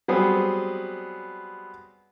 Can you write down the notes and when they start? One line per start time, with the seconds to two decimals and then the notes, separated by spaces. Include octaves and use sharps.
0.08 F#3 G3 B3 C4 G#4